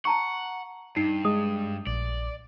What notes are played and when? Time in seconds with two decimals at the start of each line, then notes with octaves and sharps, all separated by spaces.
0.05 F#5 A5 A#5 C#6
0.96 G2 D#4 C7
1.25 G#3 D#6
1.87 A#1 D5